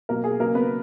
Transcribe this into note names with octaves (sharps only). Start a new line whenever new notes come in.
B2 F#3 A#3 A#4
G#4
C#3 F#3 A#3 A#4
B3 B4